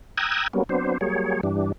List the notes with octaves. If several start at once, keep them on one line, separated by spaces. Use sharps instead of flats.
G5 A#5 D#6 E6 F#6 G#6
F#3 G3 A#3 B3 C#4
F#3 B3 C4 D4 C5
F#3 G3 A#3 G#4 C#5
G2 E3 G3 D4